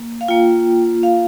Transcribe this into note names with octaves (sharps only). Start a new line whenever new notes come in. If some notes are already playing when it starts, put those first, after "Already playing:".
Already playing: A#3
F5
A#3 F4 G5
F5